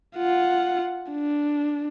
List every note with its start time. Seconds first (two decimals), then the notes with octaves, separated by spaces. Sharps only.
0.17 F4 F#5
1.12 D4